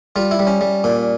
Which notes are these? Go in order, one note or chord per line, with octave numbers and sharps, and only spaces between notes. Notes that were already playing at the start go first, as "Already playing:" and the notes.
G3 F4
E4
G3
C#4
G3
A#2